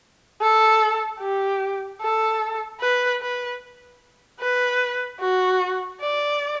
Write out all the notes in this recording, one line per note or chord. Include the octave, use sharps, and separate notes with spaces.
A4
G4
A4
B4
B4
B4
F#4
D5